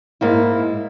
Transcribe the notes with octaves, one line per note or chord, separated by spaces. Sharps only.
G#2 A#3 E4